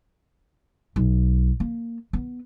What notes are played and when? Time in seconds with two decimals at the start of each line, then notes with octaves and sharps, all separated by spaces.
0.96 B1
1.60 A#3
2.13 B3